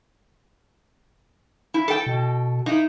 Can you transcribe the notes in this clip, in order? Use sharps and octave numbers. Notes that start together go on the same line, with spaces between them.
E4
A4 G5
B2
D#4 E4